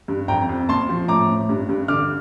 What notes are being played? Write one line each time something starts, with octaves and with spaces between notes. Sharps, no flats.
G2
F2 G5 A#5
F2
A#2 A5 C6
F3
A2 A#5 D6
A2
G2
G2
D3 D6 F6